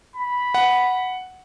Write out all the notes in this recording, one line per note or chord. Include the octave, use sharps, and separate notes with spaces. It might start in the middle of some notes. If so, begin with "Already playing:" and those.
B5
F#5